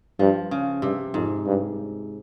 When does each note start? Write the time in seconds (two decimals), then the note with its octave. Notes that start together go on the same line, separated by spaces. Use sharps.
0.19 G2 F3
0.51 C#3
0.82 G2 C3
1.14 F2 G#2
1.46 G2